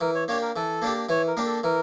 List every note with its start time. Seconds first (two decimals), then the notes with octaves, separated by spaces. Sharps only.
0.01 E3 A#4
0.15 C#5
0.28 A#3 D4 G4 C#5
0.42 A#4
0.55 E3 A4
0.82 A#3 D4 G4
1.09 E3 C#5
1.27 A#4
1.37 A#3 D4 G4
1.46 A4
1.64 E3 A#4